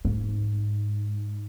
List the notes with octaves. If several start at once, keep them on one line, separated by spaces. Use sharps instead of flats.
G#2